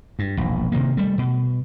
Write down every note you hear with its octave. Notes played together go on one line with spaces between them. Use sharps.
G2
E1 A#1
C3 D#3 A#3
G3 A3
B2